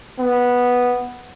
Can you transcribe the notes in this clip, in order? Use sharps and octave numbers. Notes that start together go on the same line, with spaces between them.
B3